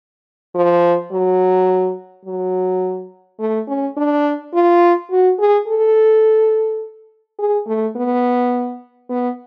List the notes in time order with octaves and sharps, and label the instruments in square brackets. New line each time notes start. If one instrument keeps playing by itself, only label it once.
[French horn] F3
F#3
F#3
A3
C#4
D4
F4
F#4
G#4
A4
G#4
A3
B3
B3